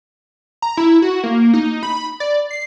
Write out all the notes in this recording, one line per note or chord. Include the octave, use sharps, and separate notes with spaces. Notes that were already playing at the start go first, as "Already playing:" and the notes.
A#5
E4
F#4
A#3
D#4
B5
D5
C7